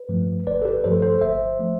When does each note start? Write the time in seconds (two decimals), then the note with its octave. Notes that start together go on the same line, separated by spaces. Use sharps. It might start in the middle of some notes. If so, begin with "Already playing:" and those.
Already playing: B4
0.09 G2 F3 A3
0.46 G1 B4 D5
0.62 A4
0.65 G4 B4
0.84 G2 F3 A3 A4 C5
1.02 A4 C5
1.21 G1 C5 E5
1.59 F3 A3